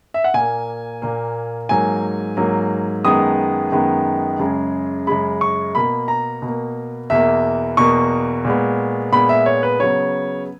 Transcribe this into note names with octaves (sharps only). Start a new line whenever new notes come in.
E5
F#5
A#2 A#3 G#5
A#2 A#3
G#2 F#3 A#3 G#5
G#2 F#3 A#3
F#2 D#3 G#3 B3 D#6
F#2 D#3 G#3 B3
F#2 C#3 G#3
F#2 C#3 G#3 B5
C#6
B2 A#3 B5
A#5
B2 A#3
E2 B2 A#3 E5
E2 B2 A#3 C#6
A#2 G#3 B3
A#2 G#3 B3 B5
E5
C#5
B4
C#3 F#3 B3 C#5